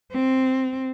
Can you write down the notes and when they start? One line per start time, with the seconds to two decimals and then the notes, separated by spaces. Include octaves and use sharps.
0.12 C4